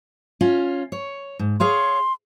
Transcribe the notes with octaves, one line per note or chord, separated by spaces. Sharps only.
C#4 F4
C#5
G#2
G#4 C#5 F5 C6